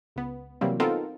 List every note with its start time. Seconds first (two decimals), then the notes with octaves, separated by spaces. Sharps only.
0.16 C#2 B3
0.61 C3 E3 F#3 G3 A#3 C4
0.80 B3 C4 D#4 F4 A4 A#4